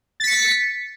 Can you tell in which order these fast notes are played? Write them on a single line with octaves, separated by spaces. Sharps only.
A6 B6 C#7